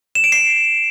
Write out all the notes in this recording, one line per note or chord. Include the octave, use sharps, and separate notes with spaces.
E7
D7
C7